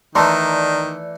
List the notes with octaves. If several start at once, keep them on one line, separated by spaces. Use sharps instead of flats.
D#3 E3 A3 D5 A5 A#5 C6